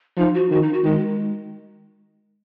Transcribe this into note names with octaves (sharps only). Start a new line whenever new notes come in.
F3 D#4
F#4
D#3 F#4
D#4
F#4
D#3 G#3